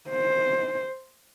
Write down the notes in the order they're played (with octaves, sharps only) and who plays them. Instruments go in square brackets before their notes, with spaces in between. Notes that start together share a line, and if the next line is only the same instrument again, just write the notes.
[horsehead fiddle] C5